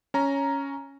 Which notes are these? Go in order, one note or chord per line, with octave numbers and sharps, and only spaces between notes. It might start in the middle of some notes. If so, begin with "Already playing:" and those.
C#4 A#5